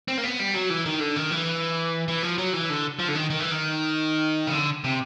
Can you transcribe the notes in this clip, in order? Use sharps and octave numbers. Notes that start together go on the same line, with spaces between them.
C4
A#3
B3
G3
F#3
E3
D#3
D3
D#3
E3
E3
F3
F#3
E3
D3
F3
D3
D#3
D#3
E3
D#3
C#3
D3
C3